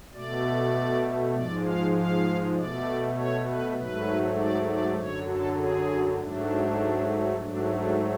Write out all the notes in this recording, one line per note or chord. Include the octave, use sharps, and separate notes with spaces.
B2 A3 D5
G#2 F3 G#3 D5
F5
F5
B2 A3 D5
C#5
B4
G#2 F#3 A3 B4
D5
D5
F#2 D3 F#3 C#5
A4
G#4
G#2 F#3 A3 D4
G#2 F#3 A3 D4
D4